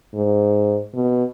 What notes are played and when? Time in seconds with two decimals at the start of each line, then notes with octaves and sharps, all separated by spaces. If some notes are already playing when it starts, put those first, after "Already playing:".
0.14 G#2
0.94 B2